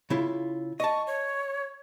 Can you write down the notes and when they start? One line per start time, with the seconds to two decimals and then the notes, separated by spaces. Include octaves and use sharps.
0.10 C#3 E4 F4
0.80 D#5 A5 C#6
1.07 C#5